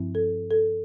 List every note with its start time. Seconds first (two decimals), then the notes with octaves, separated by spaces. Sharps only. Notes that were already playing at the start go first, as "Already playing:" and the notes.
Already playing: G2 F3 C4 E4
0.15 A4
0.51 A4